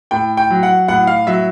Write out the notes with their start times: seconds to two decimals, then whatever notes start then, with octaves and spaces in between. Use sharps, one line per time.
0.11 A2 G5
0.37 G5
0.50 F#3
0.63 F#5
0.88 A2 F#5
1.07 F5
1.27 F#3 E5